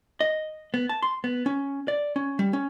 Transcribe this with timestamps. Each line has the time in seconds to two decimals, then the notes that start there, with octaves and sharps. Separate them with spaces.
0.21 D#5
0.74 B3
0.89 A5
1.02 C6
1.24 B3
1.46 C#4
1.88 D5
2.16 C#4
2.39 G3
2.53 C#4